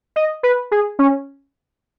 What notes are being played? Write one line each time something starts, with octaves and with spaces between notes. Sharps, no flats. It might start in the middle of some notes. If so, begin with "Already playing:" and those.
D#5
B4
G#4
C#4